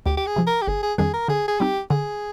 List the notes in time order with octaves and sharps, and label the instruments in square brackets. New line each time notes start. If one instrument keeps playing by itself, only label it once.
[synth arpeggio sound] D2 [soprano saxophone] G4
[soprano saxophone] G4
G#4
[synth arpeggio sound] C3 F3
[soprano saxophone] A#4
G4
[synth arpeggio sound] G1 [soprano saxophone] G#4
[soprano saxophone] G#4
[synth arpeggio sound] F2 D#3 G3 D4 [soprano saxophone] G#4
[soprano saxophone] A#4
[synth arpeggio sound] D3 [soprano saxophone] G#4
[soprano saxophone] G#4
[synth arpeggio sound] G3 C4 D#4 [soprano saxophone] G4
[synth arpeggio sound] D3 [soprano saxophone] G#4